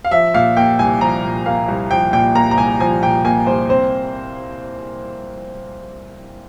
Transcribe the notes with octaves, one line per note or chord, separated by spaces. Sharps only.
F5
F3 E5
A#2 F5
A#3 G5
C2 G#5
F3 A#5
A#2
A#3 F5
C2
F3 G5
A#2 G5
A#3 A#5
A#5
C2 G#5
F3 G#5
A#2 G5
A#3 G#5
C2 C5
C4 C5